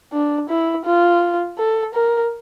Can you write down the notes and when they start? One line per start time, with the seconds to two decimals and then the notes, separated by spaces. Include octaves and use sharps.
0.12 D4
0.49 E4
0.85 F4
1.58 A4
1.94 A#4